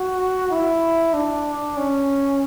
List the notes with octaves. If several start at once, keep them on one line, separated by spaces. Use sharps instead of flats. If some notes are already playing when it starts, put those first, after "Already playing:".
Already playing: F#4
E4
D4
C#4